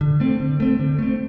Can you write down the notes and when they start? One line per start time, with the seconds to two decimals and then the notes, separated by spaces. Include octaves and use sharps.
0.01 D3
0.20 A3 C4
0.40 D3
0.60 A3 C4
0.79 D3
0.98 A3 C4